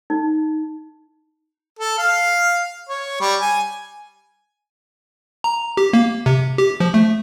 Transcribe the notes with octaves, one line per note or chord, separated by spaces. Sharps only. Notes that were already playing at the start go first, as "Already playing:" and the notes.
D#4
A4
F5
C#5
G3
G#5
A#5
G4
A#3
C3
G4
F3
A3